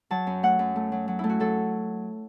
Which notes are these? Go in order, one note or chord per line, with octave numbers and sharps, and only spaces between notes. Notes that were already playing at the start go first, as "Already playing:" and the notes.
F#3 A5
F#2
A3 F#5
F#2
A3
F#3
F#3
A3 E4
F#4
F#3 A4